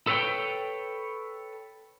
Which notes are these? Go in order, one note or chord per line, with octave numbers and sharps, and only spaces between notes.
A4 B4 C#5 F#5 G5